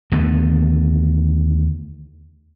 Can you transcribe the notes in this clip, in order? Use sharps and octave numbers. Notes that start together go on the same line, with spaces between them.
D#2 D3 A3 B3